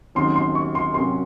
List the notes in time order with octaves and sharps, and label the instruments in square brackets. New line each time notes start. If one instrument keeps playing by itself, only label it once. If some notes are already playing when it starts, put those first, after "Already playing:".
[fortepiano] D#2 C#3 F#3 C4 D#4 [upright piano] C6
[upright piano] C6
C#6
C6
[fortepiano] C3 F#3 C#4 F#4 A#4 [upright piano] C6